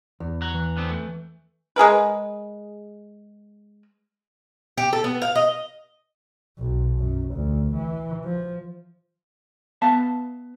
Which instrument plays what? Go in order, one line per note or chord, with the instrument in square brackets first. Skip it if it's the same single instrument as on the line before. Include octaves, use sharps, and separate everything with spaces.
[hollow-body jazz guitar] E2
[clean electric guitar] F#5 A#5
[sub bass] E3
[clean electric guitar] D3 B3 C4
A3
[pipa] G#3 G#4 A#4 B4
[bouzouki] G4
A4
B3
F5
D#5
[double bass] B1
F#2
D2
E3
F3
[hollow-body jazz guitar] B3 E5 F5 A5